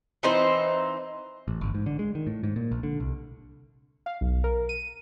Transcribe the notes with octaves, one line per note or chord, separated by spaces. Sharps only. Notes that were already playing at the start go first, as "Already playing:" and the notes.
E3 C4 D#4 C5
A1
G1
G#2
D3
G#3
D#3
A2
G#2
A#2
A#1
D3
C2
F5
B1
A#4
D#7